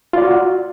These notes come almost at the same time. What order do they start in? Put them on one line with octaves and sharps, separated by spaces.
F4 D5 F#4